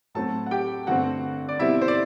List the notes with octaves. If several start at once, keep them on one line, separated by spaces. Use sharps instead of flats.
A2 F#3 A3 C4 A4 A5
F#5
G4 G5
G2 D3 A3 C4 F#4 F#5
D5
B2 G3 C4 E4 E5
C5
D5